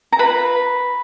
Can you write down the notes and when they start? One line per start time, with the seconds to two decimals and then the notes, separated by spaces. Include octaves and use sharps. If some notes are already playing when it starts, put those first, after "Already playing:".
0.12 A#5
0.19 F4 B4 B5